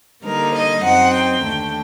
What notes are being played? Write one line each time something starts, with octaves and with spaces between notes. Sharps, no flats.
D3 G3 A#3 D#4 A#4
D#5
F#2 F#3 C4 D#4 F#5
G5
D#2 D3 A3 D4